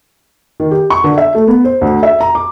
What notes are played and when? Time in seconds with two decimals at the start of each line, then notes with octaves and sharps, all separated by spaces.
0.60 D#3
0.71 G4
0.90 C#6
1.04 D3
1.18 E5
1.35 A3
1.47 B3
1.64 C5
1.81 D2
2.03 E5
2.20 A#5
2.35 D6